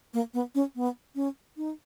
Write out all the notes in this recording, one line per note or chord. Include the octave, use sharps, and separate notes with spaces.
A#3
B3
C#4
B3
C#4
D#4